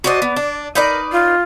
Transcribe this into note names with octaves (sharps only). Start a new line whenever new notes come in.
F#4 C5 D5 D#5
B3
D4
D#4 A#4 B4 D5
F4